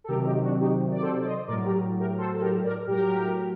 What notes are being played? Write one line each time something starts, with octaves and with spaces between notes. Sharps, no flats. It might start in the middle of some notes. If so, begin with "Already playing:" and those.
A4
C3 D#3 F#3 G4 A#4
D#4 G4
D4 F#4
D#4 G4
D5
A4 C5
D5
C5 D#5
A2 F#3 A#4 D5
G4 A#4
G4 A#4
A4 C5
A4
G4 A#4
A#4 D5
A2 F#3 G4 A#4